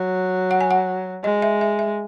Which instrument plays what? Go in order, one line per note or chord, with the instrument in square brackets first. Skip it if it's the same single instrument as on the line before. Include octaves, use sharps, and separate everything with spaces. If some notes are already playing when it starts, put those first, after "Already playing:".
Already playing: [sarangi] F#3
[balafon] F#5
G#5
F#5
[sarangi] G#3 [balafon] D#5
[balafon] E5
E5
E5